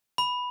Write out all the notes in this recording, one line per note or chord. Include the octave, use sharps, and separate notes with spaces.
B5